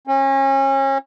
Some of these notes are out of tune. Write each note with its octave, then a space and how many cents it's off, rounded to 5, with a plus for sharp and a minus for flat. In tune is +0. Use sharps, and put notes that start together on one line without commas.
C#4 -30